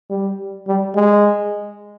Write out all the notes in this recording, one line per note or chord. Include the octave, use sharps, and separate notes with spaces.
G3
G3
G#3